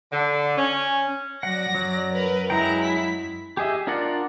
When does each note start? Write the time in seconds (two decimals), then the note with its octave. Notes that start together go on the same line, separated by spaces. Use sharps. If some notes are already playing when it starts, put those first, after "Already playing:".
0.13 D3
0.58 C#4
1.43 F#3 D5 F#5 A#6
1.75 F#2 F#3
2.12 A#4 B4
2.50 F#3 G#3 E4 G5 A#5
2.84 B6
3.57 G4 G#4 D#5 E5
3.87 D4 F4 A#4 D5 F#5